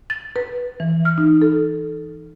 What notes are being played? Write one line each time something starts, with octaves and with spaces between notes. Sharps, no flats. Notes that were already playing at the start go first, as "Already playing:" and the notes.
A6
B4
E3
F6
D#4
A4